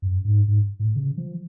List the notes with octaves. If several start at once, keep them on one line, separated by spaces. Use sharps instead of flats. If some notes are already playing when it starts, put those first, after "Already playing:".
F#2
G#2
G#2
A2
C#3
F3